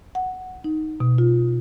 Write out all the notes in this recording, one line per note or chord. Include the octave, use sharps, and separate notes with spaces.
F#5
D#4
B2
F4